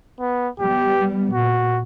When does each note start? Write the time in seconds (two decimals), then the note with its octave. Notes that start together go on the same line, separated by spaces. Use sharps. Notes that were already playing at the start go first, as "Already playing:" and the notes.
0.20 B3
0.60 G3 B3 G4
1.33 A#2 F#4